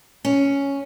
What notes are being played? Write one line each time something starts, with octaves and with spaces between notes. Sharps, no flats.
C#4